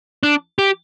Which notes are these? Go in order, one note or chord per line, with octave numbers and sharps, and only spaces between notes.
D4
G4